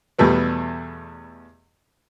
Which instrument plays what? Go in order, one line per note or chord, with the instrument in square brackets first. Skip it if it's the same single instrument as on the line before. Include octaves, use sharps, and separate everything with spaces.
[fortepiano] E2 B2 G3 A3 B3